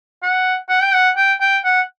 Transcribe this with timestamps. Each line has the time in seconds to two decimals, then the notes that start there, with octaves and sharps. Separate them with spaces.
0.23 F#5
0.69 F#5
0.82 G5
0.94 F#5
1.17 G5
1.41 G5
1.64 F#5